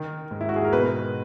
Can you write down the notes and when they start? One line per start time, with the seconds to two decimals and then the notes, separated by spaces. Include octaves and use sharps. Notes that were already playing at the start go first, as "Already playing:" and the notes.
Already playing: D#3 A#4
0.31 G#2
0.41 E4
0.49 F#4
0.56 G#4
0.64 A#4
0.73 B2 B4